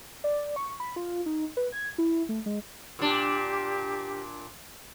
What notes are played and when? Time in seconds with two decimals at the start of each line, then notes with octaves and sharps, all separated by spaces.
0.24 D5
0.56 C#6
0.80 B5
0.96 F4
1.26 D#4
1.57 B4
1.72 G#6
1.98 E4
2.29 A3
2.46 G#3
2.99 A#2 D4 G4